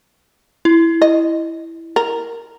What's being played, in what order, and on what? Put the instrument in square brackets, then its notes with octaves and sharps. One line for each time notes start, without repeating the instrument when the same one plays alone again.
[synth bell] E4
[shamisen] D#5
A#4